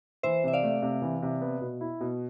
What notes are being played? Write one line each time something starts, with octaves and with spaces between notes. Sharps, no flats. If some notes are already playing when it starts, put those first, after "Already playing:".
E3 C5 E5
C3 E5
D5 F5
A3
C3
E3
C3
B3
B2
E4
B2